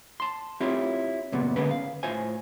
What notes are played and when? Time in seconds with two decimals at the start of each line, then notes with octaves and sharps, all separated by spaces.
0.20 A5 C6
0.60 C4 E4 F4 G4 C#5
1.32 C#2 F#2 A#2 B3
1.56 D3 G#3 A#3 B3 C#4 B4
1.71 F5
2.03 A2 F4 C5 G#5